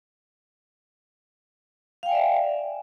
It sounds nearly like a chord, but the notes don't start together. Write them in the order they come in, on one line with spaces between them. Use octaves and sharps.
F5 G5 G#5 D5 E5